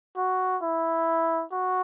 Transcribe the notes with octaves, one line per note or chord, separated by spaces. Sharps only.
F#4
E4
F#4